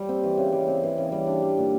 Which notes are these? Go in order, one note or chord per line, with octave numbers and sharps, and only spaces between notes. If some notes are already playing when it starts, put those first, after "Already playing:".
Already playing: G3
C4
E3
C#3
G3
C4
E3
C#3
G3
D4
G3
A#2